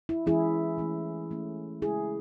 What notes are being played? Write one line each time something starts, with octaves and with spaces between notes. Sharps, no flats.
E4
E3 G#3 C#4 E4 G#4
E3 A3 C#4
E3 A3 C#4
C#3 E3 G#3 E4 G#4